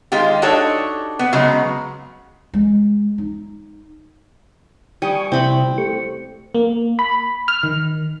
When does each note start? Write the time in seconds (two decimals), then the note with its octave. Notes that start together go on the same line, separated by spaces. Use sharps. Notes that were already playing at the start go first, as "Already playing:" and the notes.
0.12 D#3 G#3 F4 G4
0.42 D4 D#4 F#4 G4 A4 C#5
1.19 B3
1.33 C#3 F#3 G#3 B3
2.54 G#3
3.18 D#4
5.02 G3 G#5 C#6 D#6
5.32 C3 C4 E4 B5
5.78 A3 G4 C#6
6.55 A#3
6.99 B5
7.48 F6
7.63 D#3